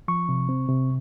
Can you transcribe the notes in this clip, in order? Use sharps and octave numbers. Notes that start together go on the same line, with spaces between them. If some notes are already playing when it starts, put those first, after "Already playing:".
F3 C#6
C3
C4
C3